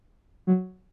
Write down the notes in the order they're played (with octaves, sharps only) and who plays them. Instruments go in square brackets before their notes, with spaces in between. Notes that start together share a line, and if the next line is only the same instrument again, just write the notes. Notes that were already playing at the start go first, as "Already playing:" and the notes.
[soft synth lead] F#3